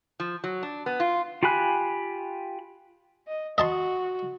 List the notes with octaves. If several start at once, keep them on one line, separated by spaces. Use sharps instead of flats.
F3
F#3
D4
B3
F4
F4 G4 G#5 B5 F#6
D#5
F#4 D#5 A5 C6